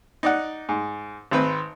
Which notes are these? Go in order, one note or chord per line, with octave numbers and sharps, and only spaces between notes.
D#4 D5 F#5
G#2
G#1 C4 B4